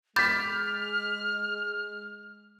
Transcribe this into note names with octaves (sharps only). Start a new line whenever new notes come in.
G#3 B5 D6 F6 G6 A6 B6